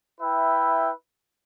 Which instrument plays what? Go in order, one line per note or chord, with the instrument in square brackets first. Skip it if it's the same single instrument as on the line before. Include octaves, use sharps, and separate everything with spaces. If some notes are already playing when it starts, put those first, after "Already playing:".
[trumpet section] E4 B4 E5 G5